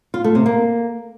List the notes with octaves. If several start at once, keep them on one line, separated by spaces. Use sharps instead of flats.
F4
A3
C3
A#3